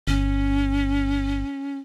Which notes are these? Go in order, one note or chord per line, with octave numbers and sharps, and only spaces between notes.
G1 C#4